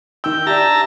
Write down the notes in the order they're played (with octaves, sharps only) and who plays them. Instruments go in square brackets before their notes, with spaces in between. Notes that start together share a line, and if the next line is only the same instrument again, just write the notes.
[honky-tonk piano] D#3 E6 [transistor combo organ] G5
[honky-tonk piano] D4 G4 [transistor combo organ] E5 A5 A#5